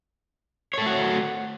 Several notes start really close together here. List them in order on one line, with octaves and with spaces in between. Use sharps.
C#5 A4 A3 F#4